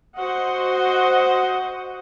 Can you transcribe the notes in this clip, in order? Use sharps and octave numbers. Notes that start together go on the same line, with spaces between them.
F#4 C5 D#5 F#5